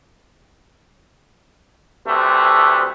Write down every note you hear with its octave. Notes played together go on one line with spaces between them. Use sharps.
D2 C3 A3 B4